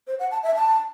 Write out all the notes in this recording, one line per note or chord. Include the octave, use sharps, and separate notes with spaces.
C5
F#5
A5
E5
A5